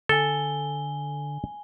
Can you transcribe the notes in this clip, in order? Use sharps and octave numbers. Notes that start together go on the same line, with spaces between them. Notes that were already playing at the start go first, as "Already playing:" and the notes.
D3 A4 G#5 G7